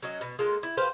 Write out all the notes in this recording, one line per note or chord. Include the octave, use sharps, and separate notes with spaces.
F#3 C#4 F#4 D#5
B2
G#3 A#3 F4 A4
E4
G4 B4 C5 F5